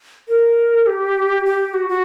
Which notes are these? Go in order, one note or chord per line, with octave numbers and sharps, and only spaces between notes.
A#4
G4
G4
F#4
F#4